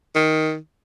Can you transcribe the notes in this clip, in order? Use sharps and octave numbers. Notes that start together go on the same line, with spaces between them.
D#3